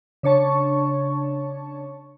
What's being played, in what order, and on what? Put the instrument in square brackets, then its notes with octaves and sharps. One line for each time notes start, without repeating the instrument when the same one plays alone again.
[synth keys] C#3 D4 C#5 A5 C#6